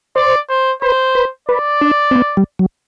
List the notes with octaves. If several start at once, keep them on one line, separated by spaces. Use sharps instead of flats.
C5 D5
C5
B4 C5
B4
B4 D5
D4
C4
B3
G3
F#3